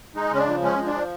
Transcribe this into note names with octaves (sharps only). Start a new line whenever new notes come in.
G#3 D#4
C#3 C#4
D4
F3
G#3 C#4
F3
D4
F3